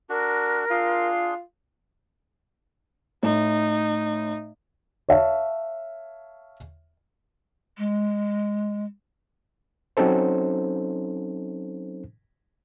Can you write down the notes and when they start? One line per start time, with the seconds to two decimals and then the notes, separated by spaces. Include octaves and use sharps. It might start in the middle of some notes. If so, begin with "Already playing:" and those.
0.10 D4 F#4 A#4
0.70 D4 F4 G#4 C6
3.23 A2 D#4
5.09 C#5 E5 F5 A5
7.78 G#3
9.97 F#3 C4 C#4 D#4 A4 C5